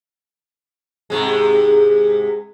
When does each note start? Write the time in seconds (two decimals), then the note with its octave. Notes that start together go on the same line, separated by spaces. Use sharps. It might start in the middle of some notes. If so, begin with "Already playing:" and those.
1.10 G#2 C3 G#3